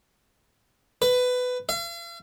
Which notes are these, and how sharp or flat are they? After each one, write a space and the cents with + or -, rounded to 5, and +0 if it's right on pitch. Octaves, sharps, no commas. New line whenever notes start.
B4 +15
F5 -45